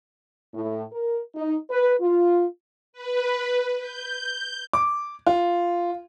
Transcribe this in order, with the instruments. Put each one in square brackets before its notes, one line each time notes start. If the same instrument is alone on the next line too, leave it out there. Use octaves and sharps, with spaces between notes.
[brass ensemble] A2
A#4
D#4
B4
F4
[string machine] B4
G6
[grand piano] D6
F4